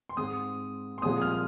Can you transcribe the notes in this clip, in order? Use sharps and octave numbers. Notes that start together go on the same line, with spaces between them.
C6
G#2 G#3 C4 D#6
C6
C2 A#2 F3 G#3 C4 D#6
F6
D#6